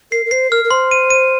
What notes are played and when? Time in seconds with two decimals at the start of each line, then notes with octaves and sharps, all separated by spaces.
0.12 A#4 C7
0.26 A#4
0.31 C5 C7
0.51 A#4 F6
0.65 A#4
0.71 C5 C6
0.91 D#7
1.10 D#7